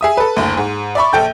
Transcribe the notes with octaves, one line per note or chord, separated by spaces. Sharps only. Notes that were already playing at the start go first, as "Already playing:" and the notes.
G#4 E5 D#6
A4 B4
F#1 D2
G#2
D5 E5 B5 C#6
A#1 A4 G5 G6